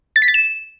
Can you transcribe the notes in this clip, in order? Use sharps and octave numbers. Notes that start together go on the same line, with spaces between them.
A6
B6
A6
E7